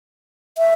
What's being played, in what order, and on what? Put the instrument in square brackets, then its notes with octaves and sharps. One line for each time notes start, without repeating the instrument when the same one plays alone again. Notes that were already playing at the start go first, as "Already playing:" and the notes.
[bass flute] E5